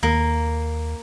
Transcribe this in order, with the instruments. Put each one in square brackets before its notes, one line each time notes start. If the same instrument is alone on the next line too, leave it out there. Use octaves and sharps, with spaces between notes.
[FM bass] D#2 [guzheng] A#3